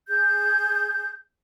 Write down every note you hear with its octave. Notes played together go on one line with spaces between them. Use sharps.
G#4 G6